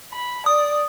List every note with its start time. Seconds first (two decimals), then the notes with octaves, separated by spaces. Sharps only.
0.12 B5
0.46 D5 D#6